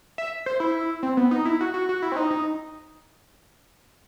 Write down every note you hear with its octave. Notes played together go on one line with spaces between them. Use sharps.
E5
C5
E4
C4
B3
D#4
E4
F#4
F#4
F#4
E4
C4
D#4
D#4